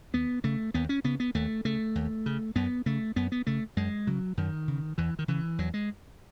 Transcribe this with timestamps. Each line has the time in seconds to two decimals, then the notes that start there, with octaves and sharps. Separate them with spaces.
0.14 D#2 B3
0.44 C#3 A3
0.74 D#2 B3
0.89 C#4
1.04 C#3 B3
1.20 B3
1.35 D#2 A3
1.65 C#3 A3
1.95 D#2
2.26 C#3
2.55 F#2 B3
2.86 C#3 A3
3.16 F#2 B3
3.32 B3
3.47 C#3 A3
3.77 F#2 G#3
4.07 C#3 F#3
4.37 F#2 D#3
4.68 C#3
4.98 E2 E3
5.19 D#3
5.28 C#3 E3
5.58 E2 F#3
5.74 G#3